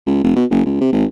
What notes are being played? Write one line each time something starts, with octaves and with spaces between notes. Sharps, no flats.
C#2
F1
B2
F#1
C#2
C3
G#1